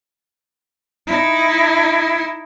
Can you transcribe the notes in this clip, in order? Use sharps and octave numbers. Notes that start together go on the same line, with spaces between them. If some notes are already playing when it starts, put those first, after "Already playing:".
D#4 E4